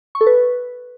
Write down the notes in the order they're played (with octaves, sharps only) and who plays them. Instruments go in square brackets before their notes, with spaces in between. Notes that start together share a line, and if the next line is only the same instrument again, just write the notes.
[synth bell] C#6
A4
B4